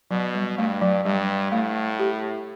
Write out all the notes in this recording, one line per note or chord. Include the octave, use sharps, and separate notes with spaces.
B2 F#3
G3
G2 A3
F#3
G2 G3
A2 A3
G4